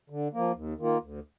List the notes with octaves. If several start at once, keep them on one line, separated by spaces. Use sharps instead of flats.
D3
F3 A#3
D#2
D#3 A#3 F4
D2